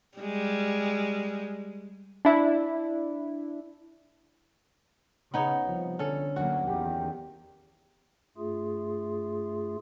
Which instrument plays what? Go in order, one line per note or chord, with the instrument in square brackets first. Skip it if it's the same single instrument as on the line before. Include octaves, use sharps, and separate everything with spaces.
[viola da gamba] G3 G#3
[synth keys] D4 E4
[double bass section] C#3 [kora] B3 D#4 C#5
[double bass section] C2 [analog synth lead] F3
[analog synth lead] D3 [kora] C#4 A4
[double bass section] D2 F#3 A#3 [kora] F#4
[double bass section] E2 D#3 [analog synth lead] G4
[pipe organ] G2 A3 F4 G#4